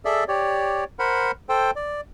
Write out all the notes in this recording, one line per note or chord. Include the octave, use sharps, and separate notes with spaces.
G#4 A4 D5 E5
G4 C#5 D5
A#4 C5 F#5 B5
A4 C5 G5
D5